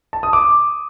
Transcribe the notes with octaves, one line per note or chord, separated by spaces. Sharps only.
A5
D#6
D6